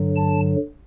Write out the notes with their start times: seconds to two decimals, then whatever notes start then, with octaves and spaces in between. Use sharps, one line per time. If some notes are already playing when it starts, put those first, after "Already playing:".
Already playing: G2 D3 F#3
0.16 A5